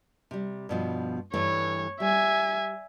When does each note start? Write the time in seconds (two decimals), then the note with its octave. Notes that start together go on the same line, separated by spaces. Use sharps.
0.31 C3 G3
0.69 G2 B2 F3
1.34 G2 E3 A3 C#5
2.00 G3 E5 G#5